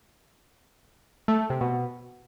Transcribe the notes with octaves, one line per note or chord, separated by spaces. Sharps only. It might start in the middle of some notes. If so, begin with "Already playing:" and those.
A3
A3
C3
B2